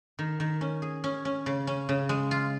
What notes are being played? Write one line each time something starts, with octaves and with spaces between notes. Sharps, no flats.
D#3
D#3
C#4
G#4
C#4
C#4
C#3
C#4
C#3
G#3
F4